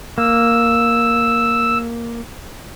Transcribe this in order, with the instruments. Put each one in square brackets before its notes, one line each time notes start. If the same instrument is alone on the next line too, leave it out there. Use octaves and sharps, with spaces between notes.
[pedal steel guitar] A#3 [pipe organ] E6